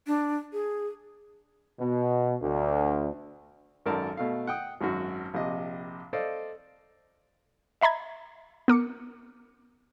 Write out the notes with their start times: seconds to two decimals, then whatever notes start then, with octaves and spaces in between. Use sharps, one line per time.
0.07 D4
0.53 G#4
1.78 B2
2.41 D2
3.86 G#1 F#2 A4 A#4 D5 A5
4.17 B2 A3 F5
4.47 F#5 G5 D#6
4.81 G#1 F#2 F#4
5.34 A#1 C3 D#5
6.13 A4 C5 D5 D#5 F5
7.81 D#5 E5 A#5 B5 G#6
8.68 B3 A#4 D6 C#7